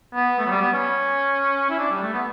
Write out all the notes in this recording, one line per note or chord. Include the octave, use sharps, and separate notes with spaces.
B3
A3
F#3
G3
B3
C#4
E4
D4
G3
A3
B3